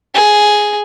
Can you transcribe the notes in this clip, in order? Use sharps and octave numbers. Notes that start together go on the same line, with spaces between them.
G#4